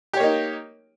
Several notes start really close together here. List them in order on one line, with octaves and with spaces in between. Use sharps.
G4 C#5 A#3 D#4